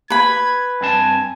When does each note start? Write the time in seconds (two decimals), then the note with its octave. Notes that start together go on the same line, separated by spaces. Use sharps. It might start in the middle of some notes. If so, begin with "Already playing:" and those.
0.10 B4 B5 G#6
0.81 G2 C4 G#5 A5